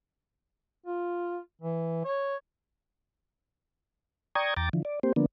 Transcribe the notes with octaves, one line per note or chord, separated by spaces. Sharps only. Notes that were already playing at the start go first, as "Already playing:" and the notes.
F4
E3
C#5
D5 G5 A#5 C#6 D#6 G#6
E2 G5 A#5 D6 A6
D3 E3 F3
D5
A#3 C4 G4 C5
D3 F3 A#3 B3 D4